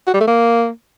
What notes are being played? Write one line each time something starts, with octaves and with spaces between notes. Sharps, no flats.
F#4
G3
A3
A#3